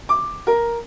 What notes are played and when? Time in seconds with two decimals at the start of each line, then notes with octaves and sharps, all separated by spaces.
0.09 D6
0.47 A#4